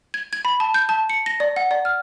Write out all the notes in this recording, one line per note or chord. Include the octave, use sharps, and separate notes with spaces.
G#6
G#6
B5
A5
G6
A5
C#7
A#6
D5
F#5
D5
F6